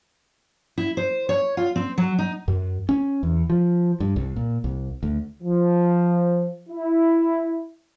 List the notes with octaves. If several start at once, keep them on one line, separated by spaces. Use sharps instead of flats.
E4
C5
C#5
F4
C4
F#3
D#4
F#2
C#4
E2
F3
G2
C2
A#2
C2
D2
F3
E4